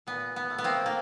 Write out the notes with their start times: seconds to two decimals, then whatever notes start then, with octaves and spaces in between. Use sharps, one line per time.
0.07 A#2 B3
0.36 B3
0.50 A3
0.58 B3
0.64 A#3 C4
0.86 A#3